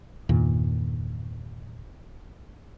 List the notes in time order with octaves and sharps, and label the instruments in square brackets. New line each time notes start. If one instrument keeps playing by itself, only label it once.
[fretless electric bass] E2 G2 A#2 D#3